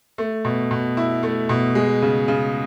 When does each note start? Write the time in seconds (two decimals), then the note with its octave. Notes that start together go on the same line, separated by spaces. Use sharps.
0.18 A3
0.45 B2
0.71 B2
0.97 E4
1.23 A3
1.49 B2
1.75 G#3
2.02 C#3
2.28 C#3